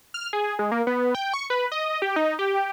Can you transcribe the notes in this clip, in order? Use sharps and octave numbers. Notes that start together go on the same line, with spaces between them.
F6
G#4
G#3
A#3
B3
G5
C#6
B4
D#5
G4
D#4
G4